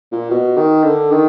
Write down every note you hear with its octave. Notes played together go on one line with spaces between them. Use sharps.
A#2
B2
D#3
D3
D#3